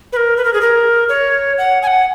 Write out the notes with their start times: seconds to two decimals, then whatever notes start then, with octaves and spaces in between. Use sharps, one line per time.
0.13 B4
0.17 A#4
0.37 B4
0.45 A#4
0.54 G#4
0.61 A#4
1.09 C#5
1.58 F#5
1.82 G#5
1.87 F#5